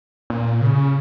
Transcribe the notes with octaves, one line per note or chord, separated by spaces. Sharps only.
A#2
C#3